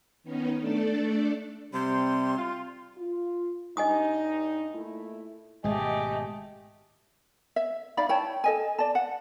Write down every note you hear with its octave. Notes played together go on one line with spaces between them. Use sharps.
D#3 B3 C#4 D#4
A3 D4 A4 D5
C3 G3 C6
F4
F4
G2 D#4 D#5 G#5 D#6
A#2 A3 E4
G#1 B2 G#3 A3 G4 D#5 G#5
E5
D#4 D5 F5 B5
E4 C#5 G5 A5
A4 D#5 G#5
D5 A5
F#5